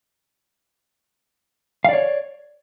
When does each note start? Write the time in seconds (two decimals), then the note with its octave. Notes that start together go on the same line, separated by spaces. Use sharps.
1.85 F5
1.89 D5
1.93 C#5